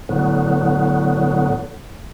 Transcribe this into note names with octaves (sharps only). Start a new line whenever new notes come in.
A2 D3 F#3 B3